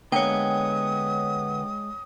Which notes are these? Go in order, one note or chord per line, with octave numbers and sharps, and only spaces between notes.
D3 G#3 A#3 B3 C#5 G5 D#6